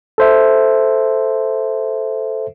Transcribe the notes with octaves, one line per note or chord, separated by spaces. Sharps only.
A4 C5 E5